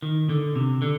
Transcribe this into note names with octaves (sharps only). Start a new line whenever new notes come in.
D#3
D3
C3
D3